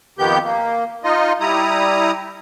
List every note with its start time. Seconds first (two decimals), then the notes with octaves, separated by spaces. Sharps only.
0.19 F2 D#3 B3 G4 G6
0.44 A#3
1.04 D#4 F4 D#5
1.40 G3 E4 A#5 D#6